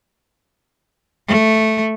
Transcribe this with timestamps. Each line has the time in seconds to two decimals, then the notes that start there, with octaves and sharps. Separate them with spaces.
1.28 A3